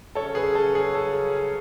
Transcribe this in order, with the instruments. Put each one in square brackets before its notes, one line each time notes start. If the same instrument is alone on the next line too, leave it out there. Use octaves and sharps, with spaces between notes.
[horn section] C#3 F#3 C#4 [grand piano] A4 C#5
[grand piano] G#4 B4
A4
G#4
A4